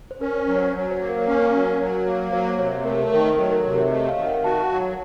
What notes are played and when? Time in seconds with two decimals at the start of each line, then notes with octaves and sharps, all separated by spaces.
0.11 C5
0.21 C#4 A#4
0.39 C5
0.47 F#3
0.56 C#5
0.74 F#3 C#5
0.91 C5
1.00 A#3
1.09 A#4
1.27 C#4 A#4
1.53 F#3
1.80 F#3
2.06 A#3
2.32 F#3 C5
2.59 C3 C#5
2.85 A3 A#4
3.01 C5
3.12 D#3 A#4
3.38 F#3 A4
3.51 A#4
3.64 C3 A4
3.78 C#5
3.91 A3 D#5
4.09 F5
4.18 D#3
4.26 F#5
4.44 F#4 A5
4.61 F#5
4.70 F#3